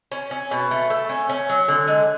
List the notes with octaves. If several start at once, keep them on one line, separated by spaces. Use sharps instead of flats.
C#4
C#4
B2
A3
A3
C#4
C#4
F#3
D3
G#3